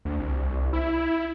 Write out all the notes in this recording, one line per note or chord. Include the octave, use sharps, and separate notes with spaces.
D2
C2
E4
E4